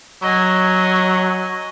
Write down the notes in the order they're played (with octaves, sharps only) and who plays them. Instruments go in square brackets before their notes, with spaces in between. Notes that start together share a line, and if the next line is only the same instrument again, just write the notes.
[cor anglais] F#3 [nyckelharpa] D#5 G#5